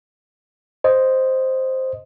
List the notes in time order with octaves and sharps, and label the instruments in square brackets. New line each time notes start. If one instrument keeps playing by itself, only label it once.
[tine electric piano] C5 D#5